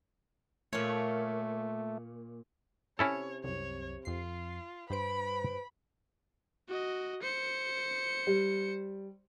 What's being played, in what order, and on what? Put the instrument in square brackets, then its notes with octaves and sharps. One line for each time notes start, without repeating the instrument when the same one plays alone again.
[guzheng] A#2 C#5 [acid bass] A3
[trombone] C3 [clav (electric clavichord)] C#4 E4 A4 [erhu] C#5
[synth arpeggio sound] C2 F#2 [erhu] C#5
[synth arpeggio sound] F2 C7 [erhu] F4
[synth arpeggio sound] G2 C5 D7 [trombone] B4 [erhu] B5
[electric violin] F#4 D#5
C5 C#7
[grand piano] G3